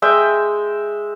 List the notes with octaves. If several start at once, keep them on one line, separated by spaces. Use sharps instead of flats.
G#3 E5 G5